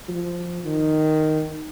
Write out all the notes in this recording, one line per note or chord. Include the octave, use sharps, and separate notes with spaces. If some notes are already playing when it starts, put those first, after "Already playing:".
F3
D#3